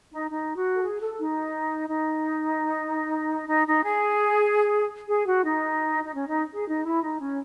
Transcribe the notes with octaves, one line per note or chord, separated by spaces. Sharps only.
D#4
D#4
F#4
A4
G#4
A4
D#4
D#4
D#4
D#4
G#4
G#4
F#4
D#4
D#4
C#4
D#4
G#4
D#4
E4
D#4
C#4